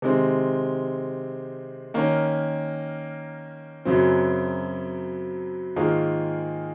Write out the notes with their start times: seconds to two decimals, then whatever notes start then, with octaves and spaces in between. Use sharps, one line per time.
0.02 C3 D#3 G#3 C4
1.94 D#3 A#3 C#4
3.85 F#2 C#3 F#3 C4
5.76 G#2 D#3 A#3 F4 G#4